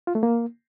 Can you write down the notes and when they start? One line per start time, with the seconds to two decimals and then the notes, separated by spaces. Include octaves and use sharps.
0.07 F4
0.15 A3
0.23 A#3